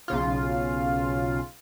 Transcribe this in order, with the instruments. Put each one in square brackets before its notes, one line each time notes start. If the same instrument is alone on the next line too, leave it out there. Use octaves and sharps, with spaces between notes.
[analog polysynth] B1 C#3 F4